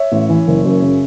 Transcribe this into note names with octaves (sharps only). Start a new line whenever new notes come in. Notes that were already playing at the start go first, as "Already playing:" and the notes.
Already playing: C#5 E5
A1
E3
F#1
F#2
C#3